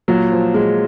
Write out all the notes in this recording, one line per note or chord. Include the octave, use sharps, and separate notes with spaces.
A#2 F#3
F3
A#2 G#3